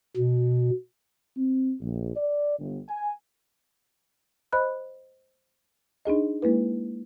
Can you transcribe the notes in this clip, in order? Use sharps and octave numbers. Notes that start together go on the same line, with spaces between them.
B2
C4
A#1
D5
G1
G#5
C5 D#5 B5 F#6
D4 D#4 G#4 D#5
G#3 A#3 E4 B4